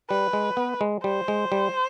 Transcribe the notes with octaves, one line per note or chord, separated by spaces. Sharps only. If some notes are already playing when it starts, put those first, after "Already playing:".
G3 B4
G#3
B3
G#3
G3 C5
G#3
G3